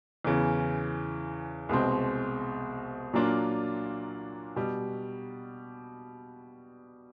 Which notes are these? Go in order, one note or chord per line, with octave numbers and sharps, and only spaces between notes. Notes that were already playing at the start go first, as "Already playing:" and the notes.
E2 C#3 E3
C2 B2 G#3 C4
A#2 F#3 A#3 D4 F4
B2 G3